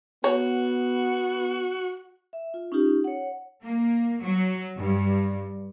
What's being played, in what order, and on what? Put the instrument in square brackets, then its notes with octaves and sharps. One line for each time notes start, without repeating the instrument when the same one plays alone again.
[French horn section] B3 [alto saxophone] F#4 [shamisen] C#5
[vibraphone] E5
F4
C#4 D#4 F4 G4
C#5 F#5
[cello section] A#3
F#3
G2